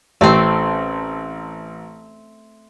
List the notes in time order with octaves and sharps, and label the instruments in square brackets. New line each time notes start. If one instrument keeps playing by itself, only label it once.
[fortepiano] A1 [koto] A3 C4